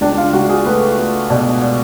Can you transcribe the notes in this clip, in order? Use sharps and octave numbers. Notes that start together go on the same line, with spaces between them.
C#2 D4
D4
F4
C#2 F#4
G#4
A3 B4
A3
B2 D5
D5